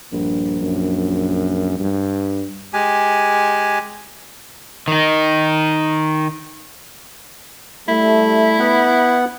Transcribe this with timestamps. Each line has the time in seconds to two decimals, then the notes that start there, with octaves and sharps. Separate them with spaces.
0.12 A#1 G2
0.61 F#2
1.79 G2
2.73 G#3 G4 G#5
4.88 D#3 D#4
7.88 G3 A3 E4
8.59 B3 F#5